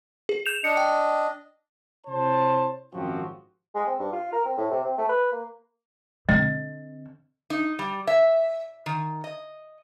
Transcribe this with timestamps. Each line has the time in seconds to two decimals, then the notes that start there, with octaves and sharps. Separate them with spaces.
0.29 G#4
0.46 G6 E7 F7
0.64 D4 D#5 C#7
0.77 G5
2.06 C3 E4 C5 C#5 A5
2.93 G#1 F#2 F3 C4 F#4 G4
3.75 G#3
3.87 C4
3.99 G2
4.12 F4
4.32 A#4
4.45 C4
4.58 A2
4.71 C3
4.84 C4
4.98 A3
5.09 B4
5.32 A#3
6.29 D3 C4 D#5
7.50 D#4
7.79 G3
8.07 E5
8.86 D#3
9.24 D#5